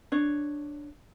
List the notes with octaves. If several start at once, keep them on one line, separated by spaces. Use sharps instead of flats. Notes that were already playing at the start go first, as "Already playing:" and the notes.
D4 C#5